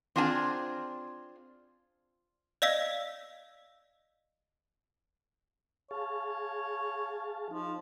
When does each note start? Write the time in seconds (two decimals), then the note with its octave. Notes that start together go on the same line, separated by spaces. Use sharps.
0.16 C4 D4 F4 G#4 G#5 A5
2.62 D5 D#5 F5 E6 B6
5.91 G#4 C#5 F5 A5
7.51 F3 D#4